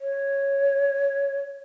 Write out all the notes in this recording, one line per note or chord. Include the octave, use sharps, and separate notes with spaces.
C#5